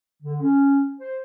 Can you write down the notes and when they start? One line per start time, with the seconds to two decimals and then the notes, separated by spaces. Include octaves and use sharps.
0.23 D3
0.42 C#4
0.99 C5